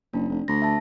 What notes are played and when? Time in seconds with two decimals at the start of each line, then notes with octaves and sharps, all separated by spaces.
0.13 F#1 D4
0.29 F1
0.48 D2 A#6
0.62 E5 A5